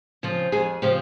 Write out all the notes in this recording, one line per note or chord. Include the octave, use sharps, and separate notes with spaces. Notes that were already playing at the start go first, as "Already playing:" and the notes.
C#3 F3 C4
F2 G#4
C#3 F3 C4 G4